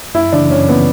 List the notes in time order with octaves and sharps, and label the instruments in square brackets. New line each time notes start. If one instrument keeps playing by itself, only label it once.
[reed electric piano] F#2 [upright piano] E4
[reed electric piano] C#3 E3 [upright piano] D4
[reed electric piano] F#2 [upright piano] C#4
[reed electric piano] C#3 E3 [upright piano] B3